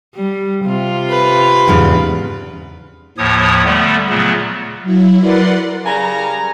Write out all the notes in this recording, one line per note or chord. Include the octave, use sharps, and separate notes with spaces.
G3
C3 F4
B4
E2 G#2 C#3
D#2 A2 F3 C#5 D#6
D3 G3 A3 B3
A#2 C#3 F#3 A3 B3
F#3 E4
A#4 B4 D5 F#5 C6
C#3 G3 A#4 G#5 A#5